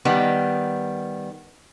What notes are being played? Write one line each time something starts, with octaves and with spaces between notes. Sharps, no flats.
D#3 G3 B3